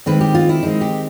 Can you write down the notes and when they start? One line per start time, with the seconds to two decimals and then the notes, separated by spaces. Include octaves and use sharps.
0.06 D#3 G#3 C4 B4
0.21 G4
0.35 F4
0.49 E4
0.63 D#3 G#3 C4 D#4
0.81 G4